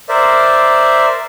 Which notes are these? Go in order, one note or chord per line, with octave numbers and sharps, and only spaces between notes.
A#4 C5 D5 E5